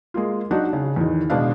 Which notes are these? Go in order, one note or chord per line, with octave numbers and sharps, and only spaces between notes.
G#3 A#3 F4
F#3 D4 D#4 F#4
C#3
E2 D#3
B2 G#3 D4 F5